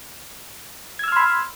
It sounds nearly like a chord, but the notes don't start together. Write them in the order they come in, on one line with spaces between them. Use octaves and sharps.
G#6 E6 F6 C6 B5